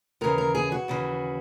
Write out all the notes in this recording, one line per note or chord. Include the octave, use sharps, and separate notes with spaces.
D#2 C#3 E3 A#4
A#4
G#4
F#4
D#2 C#3 E3